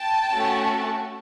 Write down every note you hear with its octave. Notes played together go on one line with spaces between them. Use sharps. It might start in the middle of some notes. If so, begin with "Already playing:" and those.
Already playing: G5 A5
A3 C#4 F#4